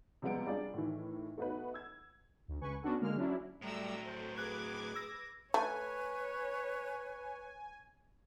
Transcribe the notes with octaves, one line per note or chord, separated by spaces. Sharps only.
C3 F3 G3 G#3 B3 D7
G3 D4 F4 G#4 D5
A2 D#3 E3
A3 B3 D#4 F#4 B4
E6 G#6
D2
C#2 B4 G#5 C#6
B3 C#4 D4 F#4 A4
D3 G#3 A#3 F6
F#3 C#4 D4 E4
A2 F#3 G3 A3 A#5 E6
A4 C5
G#4 B4 D6 F#6 G#6
E6 A#6
A3 B4 C#5 G#5